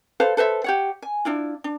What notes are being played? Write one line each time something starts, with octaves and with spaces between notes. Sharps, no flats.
A4 B4 C5 F5
A4 B4 C5 E5
G4 C#5 F#5
G#5
D4 E4 F4
D4